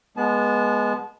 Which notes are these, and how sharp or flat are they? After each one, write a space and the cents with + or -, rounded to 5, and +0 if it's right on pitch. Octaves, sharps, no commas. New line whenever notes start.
G#3 +0 B3 -20 A5 -30